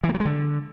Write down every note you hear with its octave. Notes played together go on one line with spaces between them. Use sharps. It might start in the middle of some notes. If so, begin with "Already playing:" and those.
E3
A#3
F#3
G#3
D3